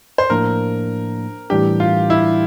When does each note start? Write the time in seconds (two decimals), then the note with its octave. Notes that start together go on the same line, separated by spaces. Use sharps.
0.18 C5
0.30 A2 F3 A#3 D4 A#4
1.50 A2 E3 G3 D4 G4
1.80 F4
2.10 E4